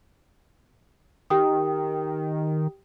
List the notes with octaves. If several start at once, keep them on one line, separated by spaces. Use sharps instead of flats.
D#3 G4 G5 D#6